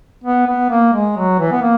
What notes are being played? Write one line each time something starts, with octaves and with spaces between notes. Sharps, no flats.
B3
B3
A#3
G#3
F#3
E3
B3
A#3